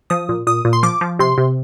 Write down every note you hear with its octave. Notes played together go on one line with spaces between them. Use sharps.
F3 D#6
A#2
A#2 D#6
A#2
C6
F3 D6
F3
C3 C6
C3